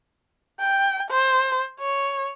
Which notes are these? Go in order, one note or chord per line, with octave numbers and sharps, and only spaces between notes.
G5
C5
C#5